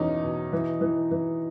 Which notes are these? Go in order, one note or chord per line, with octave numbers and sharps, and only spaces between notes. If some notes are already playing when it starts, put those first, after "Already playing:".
Already playing: E2 B2 C#4 D#4
B2
E3
E3
E3